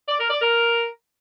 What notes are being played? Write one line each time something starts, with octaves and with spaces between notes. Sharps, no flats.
D5
A#4
D5
A#4